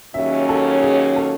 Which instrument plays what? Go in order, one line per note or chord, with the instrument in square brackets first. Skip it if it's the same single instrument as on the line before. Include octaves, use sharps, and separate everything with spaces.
[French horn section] D#2 C#3 F#3 C#4 [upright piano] E5
[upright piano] A4
G#4
A4